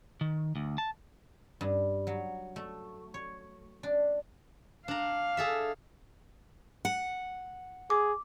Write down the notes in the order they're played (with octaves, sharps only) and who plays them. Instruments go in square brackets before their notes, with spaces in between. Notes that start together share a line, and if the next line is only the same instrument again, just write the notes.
[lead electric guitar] D#3
D2
A5
[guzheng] G2
F#3
A3
C#5
D4
[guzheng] D4 A#5 [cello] F5
[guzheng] G#4 A4 E5
[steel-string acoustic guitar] F#5
[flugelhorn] G#4 [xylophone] D6